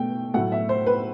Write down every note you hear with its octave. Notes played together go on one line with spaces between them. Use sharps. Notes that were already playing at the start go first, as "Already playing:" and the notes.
Already playing: B2 A3 G5
A2 F#3 A3 F#5
E5
C5
B4